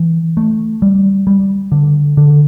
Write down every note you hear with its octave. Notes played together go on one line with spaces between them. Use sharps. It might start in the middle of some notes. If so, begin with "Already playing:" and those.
Already playing: E3
A3
G3
G3
D3
D3